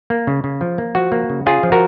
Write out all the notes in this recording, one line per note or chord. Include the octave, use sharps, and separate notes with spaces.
A#3
C#3
C#3
F3
A#3
F3 F#4
A#3
C#3
C#4 F4 G#4
F3
F#4 A#4